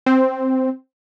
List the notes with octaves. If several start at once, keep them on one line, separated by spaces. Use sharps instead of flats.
C4